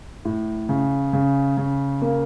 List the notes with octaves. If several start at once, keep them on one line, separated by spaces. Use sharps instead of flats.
A2
C#3
C#3
C#3
A#3